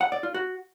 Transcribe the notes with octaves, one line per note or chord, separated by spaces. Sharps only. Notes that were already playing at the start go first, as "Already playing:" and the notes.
F#5
D5
F4
F#4